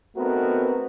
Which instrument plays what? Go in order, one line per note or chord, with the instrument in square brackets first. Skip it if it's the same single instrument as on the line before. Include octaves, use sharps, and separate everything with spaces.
[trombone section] A3 B3 C4 D#4 F#4 A#4